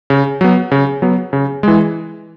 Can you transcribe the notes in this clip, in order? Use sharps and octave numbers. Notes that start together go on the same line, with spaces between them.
C#3
F#3 B3
C#3
F#3 B3
C#3
E3 G#3